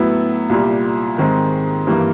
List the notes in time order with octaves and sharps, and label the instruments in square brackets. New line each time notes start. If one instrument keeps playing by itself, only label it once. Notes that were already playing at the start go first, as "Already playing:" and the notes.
Already playing: [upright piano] A2 F#3 B3 E4
C2 A#2 G3
G#2 D#3 G#3 C4
G2 E3 G3 A#3